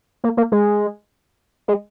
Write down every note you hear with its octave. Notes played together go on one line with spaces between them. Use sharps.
A#3
A#3
G#3
G#3